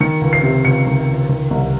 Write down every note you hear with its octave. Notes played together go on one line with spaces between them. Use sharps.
D#3 C#7
C#2
C7
C3
C#2 C#7
D#3
C#2
D#3
C2